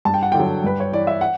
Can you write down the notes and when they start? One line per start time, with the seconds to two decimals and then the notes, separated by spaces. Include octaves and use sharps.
0.05 G2 A5
0.14 G5
0.23 F#5
0.32 D3 G5
0.39 F#3
0.64 G2 B4
0.80 C#5
0.92 E3 D5
1.07 E5
1.21 F#5